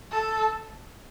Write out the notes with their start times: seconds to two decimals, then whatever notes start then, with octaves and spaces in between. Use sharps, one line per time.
0.11 A4